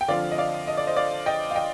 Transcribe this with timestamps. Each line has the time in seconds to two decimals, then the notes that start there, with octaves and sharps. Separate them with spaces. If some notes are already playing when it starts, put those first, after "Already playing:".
0.01 G5
0.08 D3 F3 C4 F4 D5 F5
0.31 D#5
0.38 D5 F5
0.68 D#5
0.77 D5
0.87 C5 D#5
0.96 D5 F5
1.26 D#5 G5
1.51 F5
1.55 D#5 G5